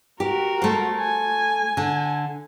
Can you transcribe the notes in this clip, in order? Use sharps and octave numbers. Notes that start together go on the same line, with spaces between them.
F#4 G4 A#4
A3 C5
G#5
D3